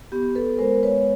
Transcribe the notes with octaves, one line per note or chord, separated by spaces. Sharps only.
B3 G4
A4 B4
G#3 A#4 C5
B4 C#5